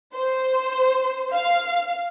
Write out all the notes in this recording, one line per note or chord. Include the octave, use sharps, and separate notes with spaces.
C5
F5